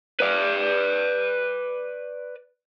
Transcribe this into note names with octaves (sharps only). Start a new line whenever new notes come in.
B4 D5